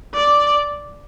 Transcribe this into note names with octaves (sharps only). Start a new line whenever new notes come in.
D5